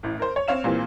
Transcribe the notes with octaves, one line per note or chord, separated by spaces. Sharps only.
A1 A2
A#4 C5
C#5
C4 C#5 F5 E7
A#2 E3 G3 A#3 C4